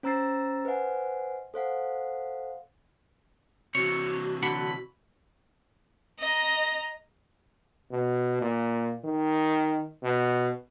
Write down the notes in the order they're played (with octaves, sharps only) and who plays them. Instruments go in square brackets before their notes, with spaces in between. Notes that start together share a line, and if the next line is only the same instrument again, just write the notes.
[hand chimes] C#4 C5 A#5 E6 A6 C7
B4 C5 D#5 F#5 G#5
A4 C5 F5 F#5
[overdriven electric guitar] C3 E3 [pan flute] F#4 [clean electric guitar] C#5
[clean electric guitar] D3 D4 F#5 [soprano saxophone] B5
[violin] D#5 A#5
[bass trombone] B2
A#2
D#3
B2